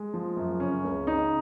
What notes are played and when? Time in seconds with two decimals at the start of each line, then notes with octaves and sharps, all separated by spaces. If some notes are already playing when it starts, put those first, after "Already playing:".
Already playing: G#3
0.14 F3
0.37 F#2
0.60 C#3 C#4
0.84 C#2
1.07 C#3 D#4